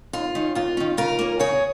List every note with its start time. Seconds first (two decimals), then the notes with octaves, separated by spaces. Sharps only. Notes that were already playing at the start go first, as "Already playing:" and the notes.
0.13 D#2 F4
0.35 D#3 C#4
0.55 D#2 F4
0.77 D#3 C#4
0.97 C#3 F4 A#4
1.19 A#3 C#4
1.39 C#3 G#4 C#5